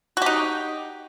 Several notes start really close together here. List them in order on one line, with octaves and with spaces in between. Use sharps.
F#4 G4 D#4